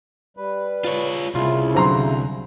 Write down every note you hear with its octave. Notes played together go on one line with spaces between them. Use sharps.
G3 B4
F4 C#5
C2 C#3 E4 F4
D3 F#3 C5 A#5 C6